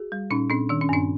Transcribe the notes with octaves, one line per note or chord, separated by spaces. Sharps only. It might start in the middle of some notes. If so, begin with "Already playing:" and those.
Already playing: F#4 G#4
G3
A#2 C#4 D#4
A#2 C4 D4
D#3 D4
C#4
G2 C4 D4